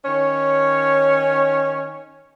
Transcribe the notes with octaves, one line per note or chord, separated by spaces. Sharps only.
D#3 C#4 C#5